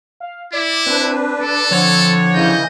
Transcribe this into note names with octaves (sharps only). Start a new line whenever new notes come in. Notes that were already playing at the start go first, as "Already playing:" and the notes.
F5
E4 D5
C4 D4 B4
A4 D6
D3 F3 C4 C#5
C#3 E3 D#5 G6